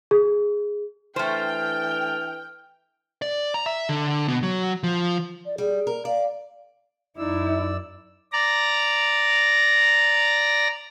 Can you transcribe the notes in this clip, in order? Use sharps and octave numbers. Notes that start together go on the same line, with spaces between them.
G#4
E3 A3 D4 C5 G5 A5 F6
D5
A#5
E5
D3
B2
F#3
F3
D5
G3 G#4
A#4
D5 F5
F#2 D#4 E4 D5 E6
D5 A#5